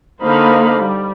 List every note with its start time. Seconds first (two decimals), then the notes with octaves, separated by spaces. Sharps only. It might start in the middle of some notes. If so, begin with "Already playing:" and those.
0.23 D3 A#3 D#4 C5 F5 B5
0.80 G3